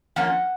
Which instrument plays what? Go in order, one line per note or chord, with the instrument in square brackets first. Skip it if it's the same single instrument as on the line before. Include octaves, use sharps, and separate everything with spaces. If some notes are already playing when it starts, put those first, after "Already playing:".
[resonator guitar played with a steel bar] F3 A#3 C#4 F#5